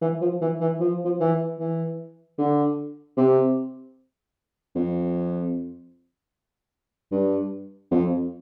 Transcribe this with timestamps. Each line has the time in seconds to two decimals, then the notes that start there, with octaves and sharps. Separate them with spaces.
0.01 E3
0.21 F3
0.41 E3
0.61 E3
0.80 F3
1.05 F3
1.20 E3
1.59 E3
2.38 D3
3.17 C3
4.76 F2
7.12 G2
7.91 F2